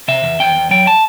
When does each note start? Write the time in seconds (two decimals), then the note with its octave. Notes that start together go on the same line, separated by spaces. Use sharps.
0.08 C3 E5
0.24 E2
0.40 E2 G5
0.55 E2
0.71 F#3 G5
0.87 A5